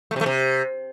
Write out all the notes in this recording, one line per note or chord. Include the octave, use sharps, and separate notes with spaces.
A3
C3
A3
C3